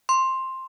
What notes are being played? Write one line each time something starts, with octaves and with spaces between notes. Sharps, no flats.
C6